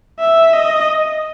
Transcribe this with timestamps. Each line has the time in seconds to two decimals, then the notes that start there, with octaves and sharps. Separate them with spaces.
0.19 E5
0.53 D#5